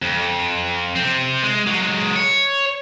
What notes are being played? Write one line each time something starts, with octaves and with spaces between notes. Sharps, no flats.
F2
C3 C4
G#3
F#3 G#3
C#5